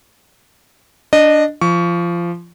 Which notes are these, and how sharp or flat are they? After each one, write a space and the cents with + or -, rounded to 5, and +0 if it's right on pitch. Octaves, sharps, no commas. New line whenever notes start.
D4 +0 D#5 -20
F3 -20 C#6 +25